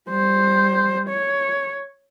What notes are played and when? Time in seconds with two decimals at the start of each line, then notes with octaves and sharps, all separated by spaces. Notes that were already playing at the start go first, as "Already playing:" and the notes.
0.10 G3 C5
1.09 C#5